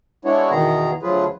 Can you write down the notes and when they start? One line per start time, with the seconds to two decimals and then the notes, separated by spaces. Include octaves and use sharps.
0.25 G#3 B3 D4 E4 F#4 C#5
0.51 E2 B2 D#3 B3 G#4 A#5
1.03 D2 F3 F#3 F4 G#4 B4